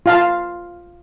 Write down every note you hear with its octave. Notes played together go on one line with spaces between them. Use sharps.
F4 F5 A5